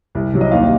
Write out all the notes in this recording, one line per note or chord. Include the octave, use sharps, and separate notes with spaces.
C2
C3 F#3
D#5
D#2 F5